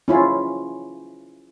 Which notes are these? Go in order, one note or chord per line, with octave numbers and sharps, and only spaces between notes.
C#4 E4 F4